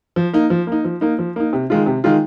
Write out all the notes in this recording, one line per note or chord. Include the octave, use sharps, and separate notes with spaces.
F3
A#3 D#4
F3
A#3 D#4
F3
A#3 D#4
F3
A#3 D#4
C3
D#3 G#3 F4
C3
D#3 G#3 F4